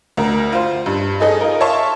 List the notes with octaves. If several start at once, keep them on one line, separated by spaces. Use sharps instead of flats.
D2 A#4
F4 C5
G2
D#4 G#4 A4 D#5
D#4 F4 A#4
C#5 E5 F5 A5 C6 C#6